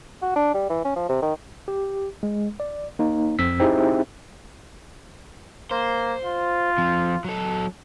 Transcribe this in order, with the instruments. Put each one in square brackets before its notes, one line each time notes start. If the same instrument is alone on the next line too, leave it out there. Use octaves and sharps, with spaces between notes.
[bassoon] F#4
D4
G3
E3
C#4
F3
C3
D#3
[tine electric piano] G4
G#3
D5
A#3 D#4
F2 C4 E6 B6
C4 D#4 E4 G4 G#4 E5
[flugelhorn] A#3 [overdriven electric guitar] C5
[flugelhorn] F4
[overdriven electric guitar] F3 C4
F#3 A4